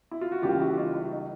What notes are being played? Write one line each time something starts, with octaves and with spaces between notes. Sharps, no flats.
E4
F4
F#4
C#2 C#3 E3 G3 A#3 F4 G4
E4 F#4
D#4 F4
E4
D#4